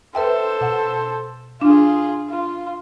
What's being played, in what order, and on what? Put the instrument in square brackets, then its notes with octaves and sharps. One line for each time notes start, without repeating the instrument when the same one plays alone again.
[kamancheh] A4 C5 [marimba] B4 E5 G5
[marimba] B2 F#5
[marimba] D4 [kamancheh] F4 G#4
[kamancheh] F4